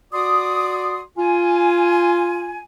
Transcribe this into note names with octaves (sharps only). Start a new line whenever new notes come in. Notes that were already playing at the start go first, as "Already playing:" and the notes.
F#4 D5 C6 D6 D#6
F4 G#5